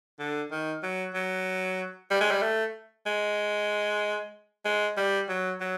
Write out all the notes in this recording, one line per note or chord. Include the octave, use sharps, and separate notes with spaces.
D3
D#3
F#3
F#3
G3
G#3
G3
A3
G#3
G#3
G3
F#3
F#3